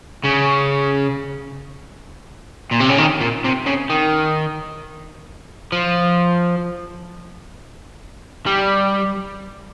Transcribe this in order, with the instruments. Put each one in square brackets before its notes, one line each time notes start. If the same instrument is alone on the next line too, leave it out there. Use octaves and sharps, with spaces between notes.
[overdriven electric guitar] C#3
A#2
C3
C#3
D#3
A#2
C3
C#3
D#3
F3
G3